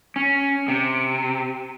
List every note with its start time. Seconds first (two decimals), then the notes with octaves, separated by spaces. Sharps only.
0.16 C#4
0.68 C3